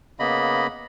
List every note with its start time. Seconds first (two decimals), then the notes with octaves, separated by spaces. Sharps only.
0.19 C#3 A#3 B3 D#5 B5